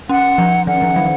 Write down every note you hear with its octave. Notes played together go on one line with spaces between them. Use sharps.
C#4 F#5
F3
D#3 F#5
F3
F#3